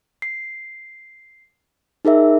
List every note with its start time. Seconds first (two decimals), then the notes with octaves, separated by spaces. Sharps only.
0.22 C7
2.05 D#4 G#4 A#4 E5